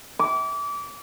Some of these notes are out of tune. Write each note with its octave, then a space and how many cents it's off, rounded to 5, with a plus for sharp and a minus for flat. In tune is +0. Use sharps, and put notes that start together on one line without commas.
D6 -30